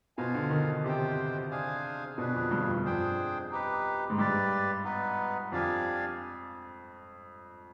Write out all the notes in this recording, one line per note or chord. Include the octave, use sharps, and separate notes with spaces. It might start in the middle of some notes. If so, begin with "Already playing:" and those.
B2 F4 C5 F5 G#5
D3
D#3
C3 G4 C5 G5
D4 G#4 C5 F5 G#5
B2 D4 G#4 B4
F2
G2
F2
G2
F2 D4 G#4 C5 G5
D#4 G4 B4
G#2
G2 G4 B4 D5
B3 D#4 B4
F2 D4 G4 D5 F5 G#5